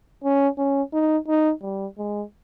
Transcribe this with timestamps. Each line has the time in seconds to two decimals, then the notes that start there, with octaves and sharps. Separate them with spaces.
0.24 C#4
0.58 C#4
0.93 D#4
1.27 D#4
1.62 G3
1.98 G#3